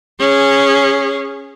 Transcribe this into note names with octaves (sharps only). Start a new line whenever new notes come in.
C#4 G#4